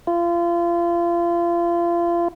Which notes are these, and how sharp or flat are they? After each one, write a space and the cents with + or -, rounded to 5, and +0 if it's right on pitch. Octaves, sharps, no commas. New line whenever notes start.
F4 -30